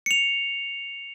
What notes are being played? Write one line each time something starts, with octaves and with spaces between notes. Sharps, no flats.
C#7 F7